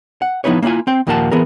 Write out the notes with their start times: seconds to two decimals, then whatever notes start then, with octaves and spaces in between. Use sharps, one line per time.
0.22 F#5
0.44 F3 B3 D#4 E4 B4 C#5
0.62 A#3 C#4 E4 F4 G#5
0.87 C4 G5
1.07 D#2 A#2 F3 A#3 F#5 A5
1.31 E3 B3 G#4 A#4